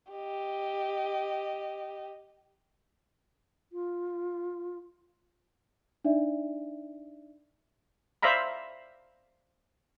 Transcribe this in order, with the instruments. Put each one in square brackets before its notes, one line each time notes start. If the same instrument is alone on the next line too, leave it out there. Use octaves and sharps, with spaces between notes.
[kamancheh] G4 D#5
[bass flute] F4
[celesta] D4 D#4 D5 E5
[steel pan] C5 D5 E5 F5 A#5 B5